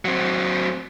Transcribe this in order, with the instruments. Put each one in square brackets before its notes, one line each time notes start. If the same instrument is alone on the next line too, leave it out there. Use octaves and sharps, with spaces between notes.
[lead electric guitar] F#3 C4